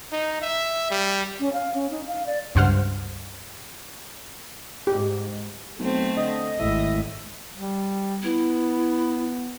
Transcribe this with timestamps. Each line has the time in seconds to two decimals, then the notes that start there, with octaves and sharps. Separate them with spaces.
0.12 D#4
0.41 E5
0.90 G3
1.40 C#4
1.53 F5
1.74 C#4
1.91 D#4
2.08 F5
2.26 D5
2.55 C#2 G2 C5 F#5 F6
4.87 G#2 G4
5.79 B1 A3 C4
6.16 D3 D#5
6.59 G#1 A2 D#5 E5
7.57 G3
8.23 B3 E4